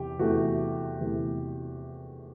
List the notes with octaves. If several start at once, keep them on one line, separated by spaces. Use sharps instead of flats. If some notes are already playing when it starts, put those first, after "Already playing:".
Already playing: E2 C3 G4
E2 C3 E3 A3 F#4
E2 C3 E3 A3